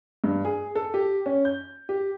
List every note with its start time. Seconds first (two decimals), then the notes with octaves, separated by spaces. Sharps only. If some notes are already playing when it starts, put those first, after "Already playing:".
0.24 G2
0.45 G#4
0.75 A4
0.94 G4
1.26 C#4
1.45 G6
1.89 G4